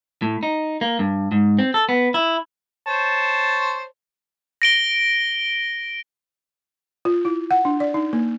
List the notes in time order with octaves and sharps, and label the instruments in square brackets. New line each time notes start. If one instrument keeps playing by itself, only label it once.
[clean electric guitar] A2
D#4
A#3
G2
G#2
C4
A4
B3
E4
[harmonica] C5 C#5 A5
[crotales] A#6 D7 G7
[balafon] F4
E4
F#5
D4
D5
D#4
A#3